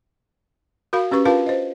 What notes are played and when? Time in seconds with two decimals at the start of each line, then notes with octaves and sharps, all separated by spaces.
0.93 F#4 A#4 F5 B5
1.11 C#4 G4 B4 C#6
1.25 D4 F4 A#4 B4 F5 A5
1.46 C5 D#5